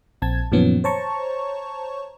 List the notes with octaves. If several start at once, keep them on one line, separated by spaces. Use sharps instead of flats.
A#1 C4 A5 G#6
F#2 A#2 D#3 F3 B3 C#4
C5 C#5 A5 A#5 C#6